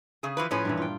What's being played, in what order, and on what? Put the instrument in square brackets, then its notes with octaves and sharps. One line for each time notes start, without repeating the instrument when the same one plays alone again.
[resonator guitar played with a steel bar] C#3 G#4
E3 F3 B4
[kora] A2 G#4 [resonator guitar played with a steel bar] F3 C#4 B4
[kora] G2 A#2 E3
F4 G5